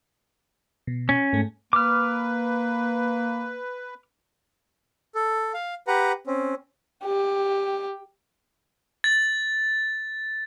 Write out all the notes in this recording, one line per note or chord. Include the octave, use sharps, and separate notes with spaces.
B2
C#4
G#2 A3
A#3 B4 D6 F6
A4
F5
G4 B4 F#5 A#5
C4 C#4
G4
A6